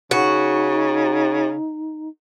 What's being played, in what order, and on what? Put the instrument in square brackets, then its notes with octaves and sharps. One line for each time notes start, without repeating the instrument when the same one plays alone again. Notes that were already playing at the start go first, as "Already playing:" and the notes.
[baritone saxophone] C#3 [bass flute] D#4 [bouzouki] F#4